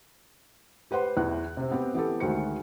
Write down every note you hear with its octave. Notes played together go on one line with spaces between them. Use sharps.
G4 B4 C5 F#5 C6
E2 E3 E4 F#6
C3 C4
B3 C4 G4
E3 B3 G4 A4
D2 D#3 G#3 F#4 C5 C#7